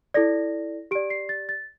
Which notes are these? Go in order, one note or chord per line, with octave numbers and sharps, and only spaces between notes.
E4 A4 D5 A#6
G4 D5 D7
C7
A6
A6